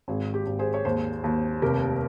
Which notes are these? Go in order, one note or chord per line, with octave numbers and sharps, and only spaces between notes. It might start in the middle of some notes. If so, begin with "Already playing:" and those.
G#1 G#4
G4
G#1
G#4 C5
C#5
D#2 G#4 C5
D#2
F1 G4 A#4